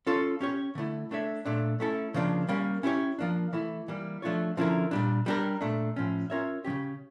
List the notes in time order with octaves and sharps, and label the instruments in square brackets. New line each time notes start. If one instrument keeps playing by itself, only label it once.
[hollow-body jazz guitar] C#4 F4 A4 C#5
C#4 G4 C#5
D3 A3 E4
A3 D4 A4 C#5 E5
A#2 A3 D4
A3 C#4 E4 A4
C#3 F3 A#3 D4
G3 A#3 C#4
C#4 E4 G4 C#5
F3 A#3 D4
E3 A3 E4
E3 G3 A#3
F3 A3 D4 F4 C#5
D3 F3 C#4 E4 A#4
A#2 G3 D4
G3 D4 G4 A#4
A#2 A3 D4
A2 F3 C#4
C#4 F4 A#4 C#5 E5
F3 C#4 G4
C#3